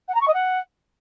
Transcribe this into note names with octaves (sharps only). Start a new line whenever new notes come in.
F#5
A#5
C#6
D#5
F#5